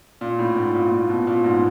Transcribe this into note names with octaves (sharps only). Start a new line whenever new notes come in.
A#2
A2
G#2
A#2
A#2
B2
A#2
G#2